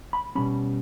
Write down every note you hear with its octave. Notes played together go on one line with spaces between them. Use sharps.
B5
B2 G3 C#4 B5